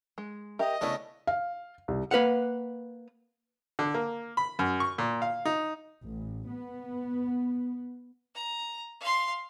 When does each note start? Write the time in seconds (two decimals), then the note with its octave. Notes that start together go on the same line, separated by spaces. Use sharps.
0.18 G#3
0.59 G4 A#4 D#5 E5
0.81 C#3 A3 B3 D4 E4
1.27 F5
1.88 C2
2.11 A#3 B4 F5 F#5
3.79 D3
3.94 A#3
4.37 B5
4.59 F#2
4.80 C#6
4.98 A#2
5.22 F5
5.45 D#4
6.03 A1
6.48 B3
8.35 A#5
9.00 F5 C6